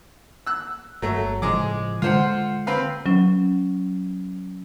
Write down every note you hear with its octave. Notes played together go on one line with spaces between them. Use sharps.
E6 F#6
G1 F#3 A3
A2 C#3 F3 G#3 G#4 D6
D3 G#3 F4 C5 F#5
C4 B4 F5
F#3 C#4